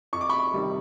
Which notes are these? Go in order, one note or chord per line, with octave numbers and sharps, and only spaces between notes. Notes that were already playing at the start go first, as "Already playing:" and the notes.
F2 C#6
D6
B5 C#6
C3 D#3 G3